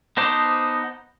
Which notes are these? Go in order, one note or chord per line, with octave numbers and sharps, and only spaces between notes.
B3 D#4 C5 A5 D6